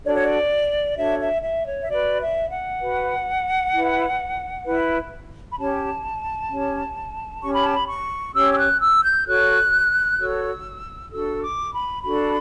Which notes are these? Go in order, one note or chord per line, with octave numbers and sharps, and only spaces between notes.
D4 F#4 A4 C#5 D5
C#5
D5
D4 F#4 A4 C#5 E5
E5
E5
C#5
E5
F#4 B4 D5
E5
F#5
F#4 B4
E4 B4
E4 B4
B5
C#4 G4 C#5 A5
C#4 G4 C#5
C#4 G4 C#5 C#6
B5
A5
B5
C#6
C#4 G4 C#5 E6
E6
F#6
E6
G6
F#4 A4 C#5 F#6
F#4 A4 C#5 E6
D4 F#4 A4 E6
D6
B5
D4 F#4 A4 B5